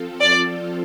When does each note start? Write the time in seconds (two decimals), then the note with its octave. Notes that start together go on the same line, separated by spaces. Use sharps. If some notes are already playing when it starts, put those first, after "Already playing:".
Already playing: F3 C4 F4 A4
0.20 D5